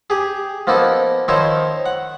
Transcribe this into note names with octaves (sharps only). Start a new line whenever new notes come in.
G4 G#4
F3 A#3 B3 D#4 E4
D#3 F3 D#4 E4 C5 C#5
F#5